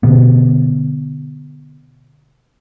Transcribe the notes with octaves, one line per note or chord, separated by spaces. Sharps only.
B2 D3 B3